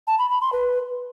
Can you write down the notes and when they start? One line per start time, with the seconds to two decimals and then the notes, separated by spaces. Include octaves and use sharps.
0.07 A5
0.19 B5
0.30 B5
0.41 C6
0.53 B4